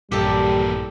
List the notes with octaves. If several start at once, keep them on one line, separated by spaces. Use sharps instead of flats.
A#1 G2 E3 G3 A#3 G4 A4